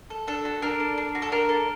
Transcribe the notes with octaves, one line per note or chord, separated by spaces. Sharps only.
A4
D4 A4
F#4
D4 A#4
A4
D4
F#4
A4
D4 A#4
A4